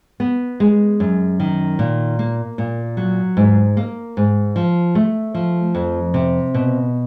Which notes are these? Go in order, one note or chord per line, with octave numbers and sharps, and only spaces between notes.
B3
G#3
F#2
D#3
A#2
A#3
A#2
F#3
G#2
A#3
G#2
F3
A3
F3
F2
C3
B2